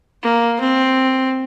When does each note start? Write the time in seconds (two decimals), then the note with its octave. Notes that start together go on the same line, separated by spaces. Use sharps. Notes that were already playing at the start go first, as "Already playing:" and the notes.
0.22 A#3
0.60 C4